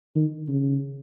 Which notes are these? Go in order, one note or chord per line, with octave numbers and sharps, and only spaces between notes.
D#3
C#3